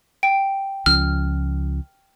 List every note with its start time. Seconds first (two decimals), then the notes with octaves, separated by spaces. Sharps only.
0.23 G5
0.86 C#2 F3 C#4 F6